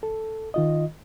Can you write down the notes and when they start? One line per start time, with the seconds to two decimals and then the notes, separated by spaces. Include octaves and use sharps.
0.03 A4
0.54 D#3 F4 D#5